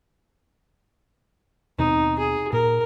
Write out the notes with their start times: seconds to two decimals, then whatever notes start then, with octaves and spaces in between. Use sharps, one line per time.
1.79 D#2 B2 C4 D#4
2.19 G#4
2.53 A#2 A#4